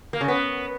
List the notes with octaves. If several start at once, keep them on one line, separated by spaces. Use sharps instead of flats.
A#3
C#3
B3